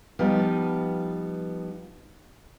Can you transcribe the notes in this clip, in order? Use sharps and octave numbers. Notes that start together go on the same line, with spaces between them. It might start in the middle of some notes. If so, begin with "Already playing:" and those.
F3 G3 B3 D#4